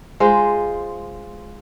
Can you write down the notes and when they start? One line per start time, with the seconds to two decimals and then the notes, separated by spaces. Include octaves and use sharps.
0.20 G#3 F4 C5